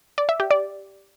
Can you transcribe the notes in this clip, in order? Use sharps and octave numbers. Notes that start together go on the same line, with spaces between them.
D5
E5
G4
D5